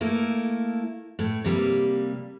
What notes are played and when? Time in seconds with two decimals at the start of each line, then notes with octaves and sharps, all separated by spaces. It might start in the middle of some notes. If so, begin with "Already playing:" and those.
0.01 A3 A#3 E4
1.19 A2
1.45 C3 G3 A#3